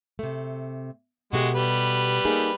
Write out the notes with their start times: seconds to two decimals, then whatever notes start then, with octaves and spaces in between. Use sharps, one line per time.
0.19 C3 A3
1.33 B2 G#3 A3 F#4 G4
1.55 G3 B4
2.25 A#3 D#4 G#4